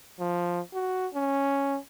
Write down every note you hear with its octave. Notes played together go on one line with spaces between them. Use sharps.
F3
F#4
C#4